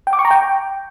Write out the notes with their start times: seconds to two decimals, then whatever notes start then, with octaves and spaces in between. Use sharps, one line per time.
0.07 G5
0.13 D6
0.19 C#6
0.25 A#5
0.31 G5